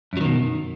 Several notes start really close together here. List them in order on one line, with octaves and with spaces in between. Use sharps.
F#2 F#3 D#3 B2